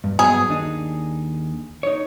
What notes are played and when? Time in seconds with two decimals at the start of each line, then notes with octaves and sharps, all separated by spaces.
0.04 G2
0.19 G2 F#3 B3 G#4
0.49 D#2 D4 D#4
1.83 D#4 C#5